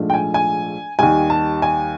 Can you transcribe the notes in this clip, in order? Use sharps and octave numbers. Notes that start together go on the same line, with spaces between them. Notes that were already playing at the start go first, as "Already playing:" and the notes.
Already playing: A#1 G#2 F3 A3
G5
G#5
G#5
D#2 D#3 G3 G#5
A5
G#5